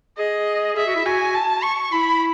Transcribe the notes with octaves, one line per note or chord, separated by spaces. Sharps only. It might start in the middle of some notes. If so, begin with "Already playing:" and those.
G#4 D#5
G#4 E5
F#4
E4
F#4 G#5
A5
C#6
E4 B5